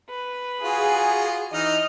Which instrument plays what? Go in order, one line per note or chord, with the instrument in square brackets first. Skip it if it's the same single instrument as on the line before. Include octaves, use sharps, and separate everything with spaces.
[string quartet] B4
[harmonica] F4 F#4 [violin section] G#4
[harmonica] E3 D#4 [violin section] D#5 [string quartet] F6